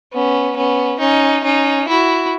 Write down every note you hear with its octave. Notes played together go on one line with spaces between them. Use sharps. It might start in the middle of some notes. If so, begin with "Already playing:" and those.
B3 C#4
B3 C#4
C#4 D#4
C#4 D#4
E4 F#4